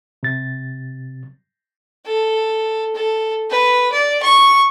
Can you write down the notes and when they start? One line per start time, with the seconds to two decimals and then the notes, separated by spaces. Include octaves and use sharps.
0.23 C3 A6
2.06 A4
2.95 A4
3.50 B4
3.92 D5
4.23 C#6